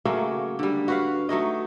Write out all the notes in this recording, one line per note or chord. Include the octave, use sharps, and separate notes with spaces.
C#3 F#3 A3 A#3
D3 G3
F#4 B4 F5
F#3 A3 D#4 D#5